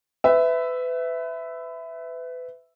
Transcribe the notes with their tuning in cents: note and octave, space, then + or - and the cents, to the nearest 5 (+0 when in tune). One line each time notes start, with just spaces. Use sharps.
B4 +30 E5 +0